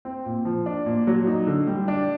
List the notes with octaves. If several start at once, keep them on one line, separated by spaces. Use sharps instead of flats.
C4
A#2
F3
D4
A#2
F#3
D#4
D3
G3
D4